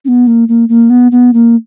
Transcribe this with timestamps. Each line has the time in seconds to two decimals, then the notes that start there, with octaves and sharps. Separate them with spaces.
0.05 C#4
0.08 B3
0.27 A#3
0.48 A#3
0.69 A#3
0.90 B3
1.12 B3
1.33 A#3